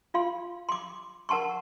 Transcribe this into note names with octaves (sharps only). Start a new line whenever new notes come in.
F4 F5 C6
C6 D6
A#4 F#5 A5 C6 C#6